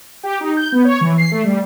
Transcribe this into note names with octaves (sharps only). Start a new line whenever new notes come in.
G4
D#4
G6
B3
C#5
E3
C7
A3
G3